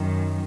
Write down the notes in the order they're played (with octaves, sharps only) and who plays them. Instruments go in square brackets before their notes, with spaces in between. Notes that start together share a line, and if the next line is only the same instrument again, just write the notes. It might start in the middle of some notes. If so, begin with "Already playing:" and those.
Already playing: [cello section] F#2 D#3